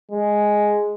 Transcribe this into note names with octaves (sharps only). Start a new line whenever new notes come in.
G#3